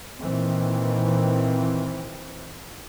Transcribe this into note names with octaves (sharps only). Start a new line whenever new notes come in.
A#2 D#3 E3 C4